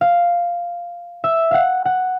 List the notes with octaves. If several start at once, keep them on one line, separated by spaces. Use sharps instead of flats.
F5
E5
F5 F#5
F#5